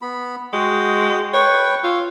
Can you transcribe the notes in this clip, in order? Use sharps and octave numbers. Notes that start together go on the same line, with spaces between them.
B3 B5
G#3 F#4 G5 D#6
B4 C#5 G5 C#6
F4 C#5 E6